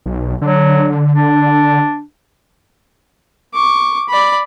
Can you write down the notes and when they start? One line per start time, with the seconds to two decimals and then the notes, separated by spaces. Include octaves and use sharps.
0.06 B1
0.42 D3 F#3
1.14 D4
3.53 C#6 D6
4.09 D5 B5